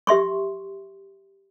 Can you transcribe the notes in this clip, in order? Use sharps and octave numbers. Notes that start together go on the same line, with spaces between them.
G4 E5 C6 C#6